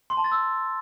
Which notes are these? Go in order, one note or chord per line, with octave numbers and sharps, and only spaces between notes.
C6
A5
A6
E6